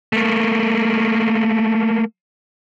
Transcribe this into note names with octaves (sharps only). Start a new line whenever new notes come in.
A3 A#3